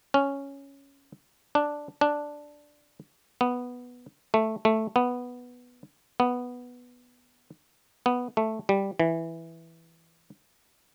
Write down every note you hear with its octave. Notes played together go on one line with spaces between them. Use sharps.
C#4
D4
D4
B3
A3
A3
B3
B3
B3
A3
G3
E3